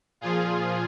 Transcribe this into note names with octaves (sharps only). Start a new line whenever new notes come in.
A#2 F3 F4 G#4